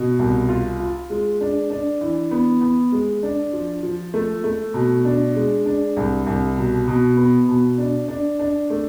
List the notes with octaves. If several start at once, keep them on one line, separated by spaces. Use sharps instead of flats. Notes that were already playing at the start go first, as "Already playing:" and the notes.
Already playing: B2
C2
F4
F4
G#3
D4
D4
E3
B3
B3
G#3
D4
F3
F3
A3
A3
B2
D4
G#3
D4
C2
C2
B2
B2
B3
B2
D4
D4
D4
A3